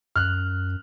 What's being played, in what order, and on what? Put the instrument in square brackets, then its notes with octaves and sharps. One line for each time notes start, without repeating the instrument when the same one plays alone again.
[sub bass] F#2 [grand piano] F6 F#6